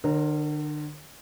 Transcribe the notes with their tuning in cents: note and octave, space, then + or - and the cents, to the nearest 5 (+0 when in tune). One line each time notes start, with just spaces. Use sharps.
D3 +40 A#4 +0 C#5 -35